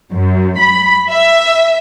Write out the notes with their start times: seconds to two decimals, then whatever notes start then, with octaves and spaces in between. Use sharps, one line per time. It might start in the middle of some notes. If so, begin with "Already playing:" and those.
0.12 F#2
0.59 B5
1.10 E5